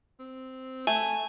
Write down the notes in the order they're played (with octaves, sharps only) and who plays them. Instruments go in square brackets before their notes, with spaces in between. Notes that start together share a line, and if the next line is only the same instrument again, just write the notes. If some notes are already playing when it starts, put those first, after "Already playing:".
[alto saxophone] C4
[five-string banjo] A3 [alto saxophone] G#5